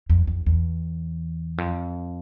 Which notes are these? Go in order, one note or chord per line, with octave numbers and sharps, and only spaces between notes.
F2
F2
E2
F2